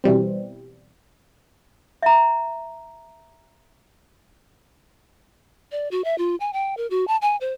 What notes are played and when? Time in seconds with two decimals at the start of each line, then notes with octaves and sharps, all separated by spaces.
0.04 B2 E3 G3 C4
2.02 E5 A#5
5.72 D5
5.91 F#4
6.04 E5
6.18 F4
6.40 G#5
6.53 G5
6.77 A#4
6.90 F#4
7.08 A5
7.22 G#5
7.41 C5